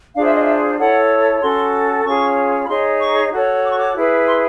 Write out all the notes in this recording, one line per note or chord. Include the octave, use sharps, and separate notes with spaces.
D4 F4 G#4 C5 F5
E5
D#5
E5
E4 A4 C#5 F#5
C#4 F#4 A4 C6
C#4 F4 G#4 C#5 C#6
B5
D#4 G#4 C#5 C6
C#6
F#4 A4 C#5
D6
C#6
D6
E4 G#4 B4
C6